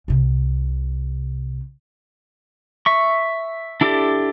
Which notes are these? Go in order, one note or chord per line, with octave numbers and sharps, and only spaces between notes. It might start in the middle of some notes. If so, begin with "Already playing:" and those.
C2 C3
E5 C#6
D4 E4 G4 A4 D5